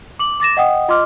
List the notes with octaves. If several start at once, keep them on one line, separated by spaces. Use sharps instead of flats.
D6 F#7
D6 A6 A#6 E7
D#5 F#5 G5 D#6
F4 D#5 C6 D6 F6